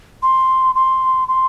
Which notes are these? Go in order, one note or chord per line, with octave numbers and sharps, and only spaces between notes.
C6
C6
C6